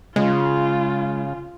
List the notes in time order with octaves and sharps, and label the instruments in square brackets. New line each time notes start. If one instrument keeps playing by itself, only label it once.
[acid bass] C#3 [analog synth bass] G#3 [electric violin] F4